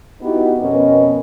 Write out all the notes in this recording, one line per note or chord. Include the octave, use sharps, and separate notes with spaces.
B3 D#4 E4 F#4 G4 B4
F2 B2 B3 C#4 A#4 D#5